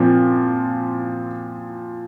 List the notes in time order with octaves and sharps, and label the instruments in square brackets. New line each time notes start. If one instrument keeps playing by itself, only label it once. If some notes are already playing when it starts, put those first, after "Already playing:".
Already playing: [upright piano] A#2 F3 C4